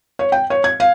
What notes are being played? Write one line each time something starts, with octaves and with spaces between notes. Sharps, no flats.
C#5
G5
C#5
G#6
F5